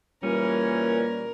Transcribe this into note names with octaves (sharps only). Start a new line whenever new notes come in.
A#2 E3 G3 C#4 A#4